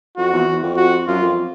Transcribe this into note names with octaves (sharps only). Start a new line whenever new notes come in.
F2 F#4
E2
E2
F2
F#4
F#2 F4
F2